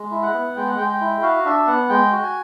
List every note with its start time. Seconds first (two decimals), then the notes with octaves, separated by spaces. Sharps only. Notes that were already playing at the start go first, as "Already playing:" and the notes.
Already playing: G#3
0.11 E4
0.22 F#5
0.34 B3
0.56 G#3 G5
0.67 F#5
0.77 G#3 G5
0.90 G5
1.01 E4
1.22 F#4 F5
1.45 D4 E5
1.67 B3 F#5
1.89 G#3 G5
2.12 F#4
2.23 G#5